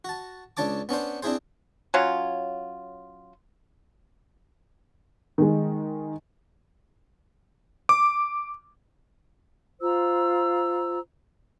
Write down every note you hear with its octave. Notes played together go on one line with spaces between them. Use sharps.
F#4 A5
C#2 D4 C#5 A5 D6
B3 C#4 D4 C5
C4 D4 E4 G#4 C5
F#3 C#4 F4
D#3 G#3
D6
F4 C5 A#5 E6